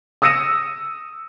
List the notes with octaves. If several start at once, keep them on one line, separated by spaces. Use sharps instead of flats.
D#6 E6 A#6 C#7 D#7 E7